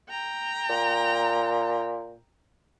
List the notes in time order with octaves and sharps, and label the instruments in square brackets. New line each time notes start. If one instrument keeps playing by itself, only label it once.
[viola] G5 A#5
[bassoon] A#2